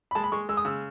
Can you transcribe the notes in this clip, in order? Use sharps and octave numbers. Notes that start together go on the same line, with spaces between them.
B5
G#3 A5
B5
G#3 C#6
G#3 E6
D#6
C#3 E6